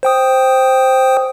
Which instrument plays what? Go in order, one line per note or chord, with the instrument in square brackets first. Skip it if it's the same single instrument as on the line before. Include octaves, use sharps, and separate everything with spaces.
[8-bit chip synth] C5 G5 D#6